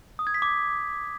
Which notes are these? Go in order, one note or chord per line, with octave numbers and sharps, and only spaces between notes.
D#6
G#6
B6
D6